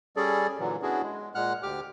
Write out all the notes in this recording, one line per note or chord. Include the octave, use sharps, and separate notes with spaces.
G3 C#4 G#4 A4 D5
A#2 D3 E3 F#3
B3 C#4 D4 E4 F#4 G#4
G#3
A#2 G#3 F#5 F6 F#6
D2 G4 D6 F6